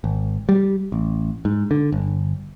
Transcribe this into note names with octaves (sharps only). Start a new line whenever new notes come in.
G#1
G3
A1
G#2
D3
G1